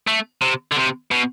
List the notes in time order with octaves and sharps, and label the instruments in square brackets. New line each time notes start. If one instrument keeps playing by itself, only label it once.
[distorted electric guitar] A3
C3
D3
C3
B2